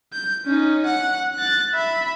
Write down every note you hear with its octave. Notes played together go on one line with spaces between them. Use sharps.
G6
C#4 D#4
F#5
F#6 A6
E5 B5